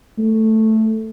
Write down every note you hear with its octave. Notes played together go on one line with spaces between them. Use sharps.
A3